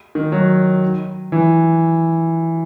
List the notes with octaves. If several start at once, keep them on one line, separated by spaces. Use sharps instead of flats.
D#3
F#3
E3